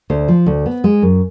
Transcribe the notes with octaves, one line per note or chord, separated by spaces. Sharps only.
D2 C5
F3
D2
B3
G#3
F#2